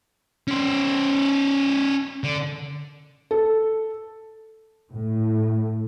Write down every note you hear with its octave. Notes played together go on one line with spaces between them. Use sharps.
C#4 C5
D3
A4
A2